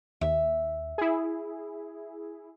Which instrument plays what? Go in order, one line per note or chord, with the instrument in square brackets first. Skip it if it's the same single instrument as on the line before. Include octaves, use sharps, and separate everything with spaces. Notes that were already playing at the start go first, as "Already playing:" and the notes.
[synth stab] D#2 [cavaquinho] E5
[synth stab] E4 G#4